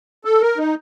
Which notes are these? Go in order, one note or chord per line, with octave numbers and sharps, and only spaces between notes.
A4
A#4
D#4